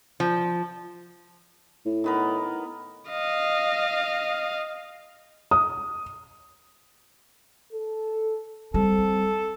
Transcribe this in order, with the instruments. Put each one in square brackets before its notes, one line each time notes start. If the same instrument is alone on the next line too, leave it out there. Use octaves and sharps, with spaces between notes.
[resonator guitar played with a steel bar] F3
[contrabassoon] A2
[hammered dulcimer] D#3 B3 A#4
[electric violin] D#5 F5
[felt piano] D#6
[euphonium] A4
[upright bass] G3 [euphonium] C4 [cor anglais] A4